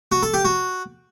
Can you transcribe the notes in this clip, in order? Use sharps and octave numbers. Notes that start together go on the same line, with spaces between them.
F#4
A4
G4
F#4